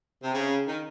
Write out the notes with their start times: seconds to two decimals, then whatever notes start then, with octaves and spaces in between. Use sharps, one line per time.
0.23 C3
0.33 C#3
0.66 D#3